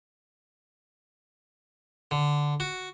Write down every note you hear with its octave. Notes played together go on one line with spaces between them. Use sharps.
D3
F#4